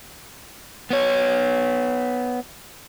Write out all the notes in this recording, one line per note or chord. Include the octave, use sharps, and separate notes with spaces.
B3 C#5